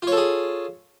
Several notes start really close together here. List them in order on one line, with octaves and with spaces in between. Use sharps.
F4 C#5 A4 G#4